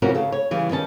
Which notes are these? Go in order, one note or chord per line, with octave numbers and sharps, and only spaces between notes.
C3 E3 F3 C#4 F#4 A#4
C#3 A4
C#5
C#3 E3 G3
D#3 C#4 A5